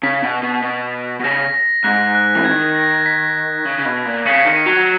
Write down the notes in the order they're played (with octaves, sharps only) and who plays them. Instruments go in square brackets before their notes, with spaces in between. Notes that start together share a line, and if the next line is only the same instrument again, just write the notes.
[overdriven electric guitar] C#3 [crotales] B6
[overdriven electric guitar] B2
B2
B2
B2
[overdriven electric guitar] C#3 [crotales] A#6
[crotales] A#6
[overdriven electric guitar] G#2 [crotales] F#6
[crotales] F#6
[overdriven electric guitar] E3
[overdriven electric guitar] D#3 [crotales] G#6
[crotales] A#6
B6
[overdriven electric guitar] C#3
C#3
B2
A#2
[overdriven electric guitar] C#3 [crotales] C#7
[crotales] B6
C#7
[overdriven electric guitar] D#3
[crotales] D#7
[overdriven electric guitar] F#3